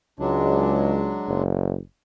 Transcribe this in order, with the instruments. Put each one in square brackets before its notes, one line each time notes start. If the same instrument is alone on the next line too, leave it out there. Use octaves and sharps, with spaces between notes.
[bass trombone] C#2 [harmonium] F#3 G#3 D4
[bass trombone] F#1